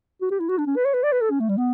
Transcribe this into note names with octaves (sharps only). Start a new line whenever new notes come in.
F#4
G4
E4
F#4
D4
C#4
B4
C#5
B4
D5
B4
A4
C#4
A3
G3
B3